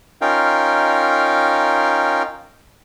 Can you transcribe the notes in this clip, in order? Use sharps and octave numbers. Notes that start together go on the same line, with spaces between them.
C#4 D#4 F4 A#4 F5 G5